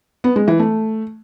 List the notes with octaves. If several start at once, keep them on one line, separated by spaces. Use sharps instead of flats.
B3
G#3
E3
A3